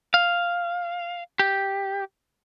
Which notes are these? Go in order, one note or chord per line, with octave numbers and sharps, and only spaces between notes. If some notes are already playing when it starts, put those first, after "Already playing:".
F5
G4